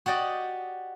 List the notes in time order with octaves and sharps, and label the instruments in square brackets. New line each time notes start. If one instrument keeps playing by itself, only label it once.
[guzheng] F#4 G4 D5 D#5